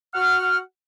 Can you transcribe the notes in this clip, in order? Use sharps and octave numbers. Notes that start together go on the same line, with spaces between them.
F#4 F#5 F6